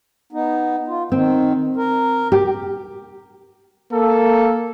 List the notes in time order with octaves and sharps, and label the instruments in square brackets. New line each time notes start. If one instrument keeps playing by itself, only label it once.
[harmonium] B3 D#4
F4
[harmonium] D#3 [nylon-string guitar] C4
[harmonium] A#4
[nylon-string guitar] G4
[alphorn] A#3 [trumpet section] A4